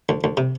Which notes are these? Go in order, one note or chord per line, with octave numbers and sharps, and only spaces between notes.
D2
D2
C3